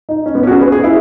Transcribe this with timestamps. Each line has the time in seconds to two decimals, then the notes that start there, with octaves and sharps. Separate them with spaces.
0.09 D#4
0.26 C#4
0.35 B3
0.43 C#4
0.47 F#4
0.51 G#4
0.61 B4
0.72 G#4
0.84 E4